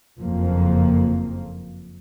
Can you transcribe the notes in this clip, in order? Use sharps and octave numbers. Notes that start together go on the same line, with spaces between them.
F#1 F2 F3 A#3